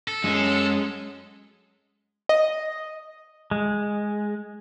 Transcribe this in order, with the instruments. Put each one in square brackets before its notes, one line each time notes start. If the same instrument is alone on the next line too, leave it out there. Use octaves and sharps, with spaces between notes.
[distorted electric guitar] A4
[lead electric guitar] F#2 C#4 [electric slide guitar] G#3
[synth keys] D#5
[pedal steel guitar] G#3